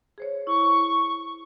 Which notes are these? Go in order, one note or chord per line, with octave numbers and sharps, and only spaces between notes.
G#4 C5 C#5
E4 C#6